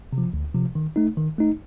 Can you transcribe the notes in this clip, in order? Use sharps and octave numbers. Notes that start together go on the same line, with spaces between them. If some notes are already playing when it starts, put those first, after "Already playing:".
C3
F3
D2
C3 F3
D#3
A3 D#4
D#3
A3 D#4